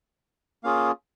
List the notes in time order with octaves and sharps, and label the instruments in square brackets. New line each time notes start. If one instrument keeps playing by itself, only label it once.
[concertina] A#3 C#4 F4 G#4 F5